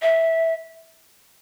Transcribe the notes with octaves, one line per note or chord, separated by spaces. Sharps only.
E5